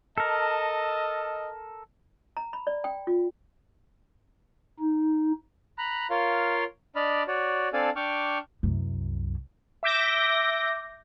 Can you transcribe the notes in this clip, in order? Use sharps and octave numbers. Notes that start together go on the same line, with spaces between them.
A4 A#4 D#5 A5
A#5
B5
D5
G5
F4
D#4
A#5 B5 F#6
F4 A#4 C#5 F5 C6
D4 D5 D#5 B5 F6
F#4 C#5 D5
C4 D4 A4 D5 F5 G#5
D4 G5 C#6 D6 F6
C2 F#2
E5 D6 G6 A#6